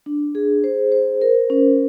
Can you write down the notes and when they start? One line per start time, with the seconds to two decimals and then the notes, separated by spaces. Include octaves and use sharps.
0.06 D4
0.35 G#4
0.64 C5
0.92 C5
1.22 A#4
1.50 C#4